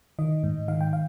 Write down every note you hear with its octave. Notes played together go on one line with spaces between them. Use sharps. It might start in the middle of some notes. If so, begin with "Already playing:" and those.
D#3 D#5
G#2
D#3 F5
G5
F5